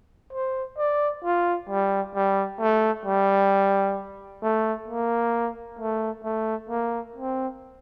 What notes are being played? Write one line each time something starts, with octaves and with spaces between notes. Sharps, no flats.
C5
D5
F4
G3
G3
A3
G3
A3
A#3
A3
A3
A#3
C4